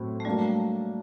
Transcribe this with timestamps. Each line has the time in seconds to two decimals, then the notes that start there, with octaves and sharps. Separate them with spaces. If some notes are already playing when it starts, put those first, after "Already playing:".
Already playing: A2 F#3 C4 F#4
0.20 A3
0.25 F#3 G3 A#3 D4